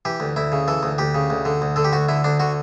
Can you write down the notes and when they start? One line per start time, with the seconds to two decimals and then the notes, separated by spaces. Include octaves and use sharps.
0.05 E3 G4
0.20 D2
0.36 D2 E4
0.52 C#3
0.68 E3 A4
0.83 D2
0.98 D2 G4
1.15 C#3
1.30 D2
1.45 D3
1.62 D2
1.76 D3 A4
1.84 G4
1.93 D2 F#4
2.08 D3 E4
2.24 D2 D4
2.40 D3 F#4